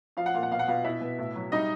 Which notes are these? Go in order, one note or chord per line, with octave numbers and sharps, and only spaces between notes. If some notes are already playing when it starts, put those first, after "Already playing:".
F3 F5
F#5
A#2 F5
F#5
B2 F5
F#5
B2 F4 F5
B2 E4 E5
B2
A2
F#3
G3 D#4 D#5